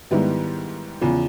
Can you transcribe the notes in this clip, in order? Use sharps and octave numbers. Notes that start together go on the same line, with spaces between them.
G#2 D#3 G3 B3 E4
E2 C#3 F3